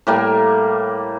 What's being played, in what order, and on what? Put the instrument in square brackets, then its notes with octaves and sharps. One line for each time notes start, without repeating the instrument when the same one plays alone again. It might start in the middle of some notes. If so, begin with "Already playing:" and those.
[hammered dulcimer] A2 G3 A#3